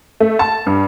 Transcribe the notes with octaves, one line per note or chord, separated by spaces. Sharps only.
A3
A5
G2